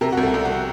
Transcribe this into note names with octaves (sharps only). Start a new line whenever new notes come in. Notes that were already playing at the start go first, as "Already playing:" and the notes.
C3 A#4
C2 F#4
A4
C2
F#4